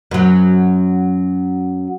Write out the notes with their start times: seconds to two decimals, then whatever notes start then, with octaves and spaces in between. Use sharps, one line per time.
0.11 F#2 F#3